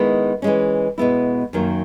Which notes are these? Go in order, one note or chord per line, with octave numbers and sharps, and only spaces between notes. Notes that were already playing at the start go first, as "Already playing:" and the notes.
Already playing: D#3 G#3 B3 E4
E3 G#3 C#4
B2 G#3 B3 E4
F#2 D#3 F#3 A#3